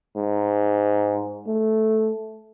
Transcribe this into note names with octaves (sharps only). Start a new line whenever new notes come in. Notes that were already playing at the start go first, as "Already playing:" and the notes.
G#2
A3